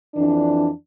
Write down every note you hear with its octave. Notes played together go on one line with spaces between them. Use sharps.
F2 E3 D4